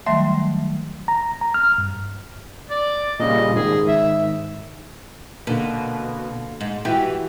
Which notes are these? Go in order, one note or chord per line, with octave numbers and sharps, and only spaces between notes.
D#3 F#3 G3 A3 E5 C6
A#5
A#5
F6
G2
D5
A#2 C#3 G3 D#5
G#2 D#3 G#4
E5
B2 D3 A#3
G#2
E3 E4 F#4 G4